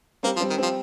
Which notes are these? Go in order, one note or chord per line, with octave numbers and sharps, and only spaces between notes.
G3 A#3 C4
F3
G3 C4
D#3
G3 C4
F3